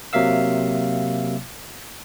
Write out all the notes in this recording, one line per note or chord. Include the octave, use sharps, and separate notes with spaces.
C3 F#3 A#3 E5 F5 E6